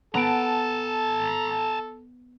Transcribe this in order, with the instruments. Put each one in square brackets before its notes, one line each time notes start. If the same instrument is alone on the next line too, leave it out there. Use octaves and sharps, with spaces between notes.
[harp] B3 D7 [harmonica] A4 [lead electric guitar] A5 A#5